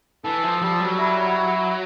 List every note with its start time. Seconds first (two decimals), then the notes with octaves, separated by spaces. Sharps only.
0.24 E3 A4
0.43 F3
0.62 F3 G3
0.80 F#3
0.98 E4